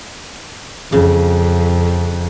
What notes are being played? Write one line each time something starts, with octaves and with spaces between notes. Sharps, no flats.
F2 C#3